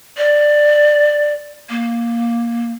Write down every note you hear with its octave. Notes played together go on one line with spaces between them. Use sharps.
D5
A#3